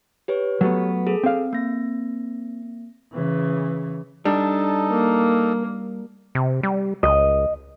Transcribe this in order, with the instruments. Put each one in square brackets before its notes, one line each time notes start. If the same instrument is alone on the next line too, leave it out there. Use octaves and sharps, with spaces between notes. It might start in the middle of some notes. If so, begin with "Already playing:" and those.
[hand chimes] G4 B4 C#5
[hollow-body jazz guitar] F#3 A3 B3
[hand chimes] G#4 A4
[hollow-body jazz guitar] C4 F5
[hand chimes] A#3 A#6
[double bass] C#3 E3
[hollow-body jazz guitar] G3 [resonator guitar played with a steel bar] D4 [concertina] D#4 A4
[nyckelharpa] A#3
[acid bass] C3
G3
[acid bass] C#2 [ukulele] D#5